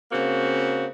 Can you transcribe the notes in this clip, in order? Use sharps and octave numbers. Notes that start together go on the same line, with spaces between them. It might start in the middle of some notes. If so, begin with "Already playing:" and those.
C#3 A#3 C4 F#4